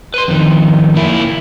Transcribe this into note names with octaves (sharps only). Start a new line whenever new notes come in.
B4 C6
F2 D#3
A#3 E4